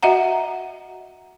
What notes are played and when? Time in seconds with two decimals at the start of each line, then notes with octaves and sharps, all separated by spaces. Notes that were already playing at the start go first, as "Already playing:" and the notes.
0.03 F#4 D#5 E5 F#5 A#5